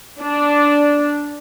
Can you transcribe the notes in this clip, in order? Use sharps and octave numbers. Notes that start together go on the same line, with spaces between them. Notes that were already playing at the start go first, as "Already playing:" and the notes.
D4